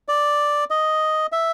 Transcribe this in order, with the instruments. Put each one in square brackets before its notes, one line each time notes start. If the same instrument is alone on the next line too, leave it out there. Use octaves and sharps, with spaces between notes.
[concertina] D5
D#5
E5